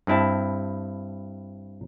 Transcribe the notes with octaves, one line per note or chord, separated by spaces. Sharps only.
G2 C4 E4 A5